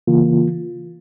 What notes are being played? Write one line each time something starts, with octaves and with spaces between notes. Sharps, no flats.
C#3 E3 A#3 F4